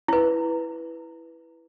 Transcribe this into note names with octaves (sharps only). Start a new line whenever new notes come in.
E4 B4